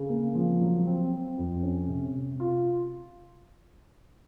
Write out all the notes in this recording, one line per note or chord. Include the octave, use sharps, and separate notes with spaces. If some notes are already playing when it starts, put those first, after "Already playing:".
Already playing: C#3
A#3
F3
F#3
C4
C4
F2
C#4
C3
C3
F4